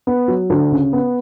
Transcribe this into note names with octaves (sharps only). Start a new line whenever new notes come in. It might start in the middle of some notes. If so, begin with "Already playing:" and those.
B3
F#3
D2
C#3
B3